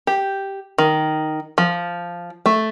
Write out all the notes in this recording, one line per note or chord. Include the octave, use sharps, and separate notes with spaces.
G4
D#3
F3
A3